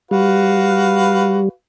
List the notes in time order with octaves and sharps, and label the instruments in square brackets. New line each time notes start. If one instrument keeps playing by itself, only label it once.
[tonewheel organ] G3 [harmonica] F#4 B4 F5